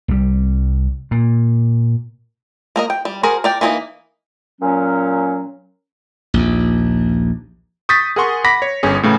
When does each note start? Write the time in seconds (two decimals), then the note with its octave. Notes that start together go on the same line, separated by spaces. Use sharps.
0.08 C2 G3
1.11 A#2
2.76 A#3 A#4 D#5
2.90 G5
3.05 G3
3.23 F#4 G#4 A#4 C5
3.44 A#4 D5 G5
3.61 E3 A#3 D4 D#4 D#5
4.61 A#2 F#3 C#4
6.34 A#1 D#2
7.89 C#6 D#6 G6 A6 B6
8.16 G#4 A#4 F#5 C6 C#6
8.44 F#5 B5 D6 A#6 B6
8.62 C#5
8.83 G1 C#4 G#4
9.03 A2 C#3 E3